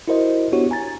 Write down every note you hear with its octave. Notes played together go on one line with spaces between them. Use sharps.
E4 F#4 A#4 C5 D#5
B3 D4 E4 F#4 G4 C#5
G#5 A#5 A6